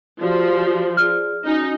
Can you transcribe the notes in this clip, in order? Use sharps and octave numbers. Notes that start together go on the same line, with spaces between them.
F3 F#4 G4 D5
G#4 D5 F6
C#4 D#4 F#4 G#5